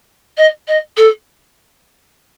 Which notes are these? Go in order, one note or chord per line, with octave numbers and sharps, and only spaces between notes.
D#5
D#5
A4